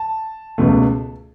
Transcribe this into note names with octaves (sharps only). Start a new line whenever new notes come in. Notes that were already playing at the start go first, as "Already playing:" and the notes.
Already playing: A5
C#2 B2 A3